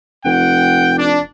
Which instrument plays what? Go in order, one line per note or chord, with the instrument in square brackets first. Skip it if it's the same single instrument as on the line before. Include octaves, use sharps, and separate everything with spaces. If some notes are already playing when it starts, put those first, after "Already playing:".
[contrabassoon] F1 [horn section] F#5 G5
[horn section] D4